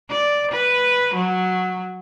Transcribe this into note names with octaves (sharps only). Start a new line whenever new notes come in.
D5
B4
F#3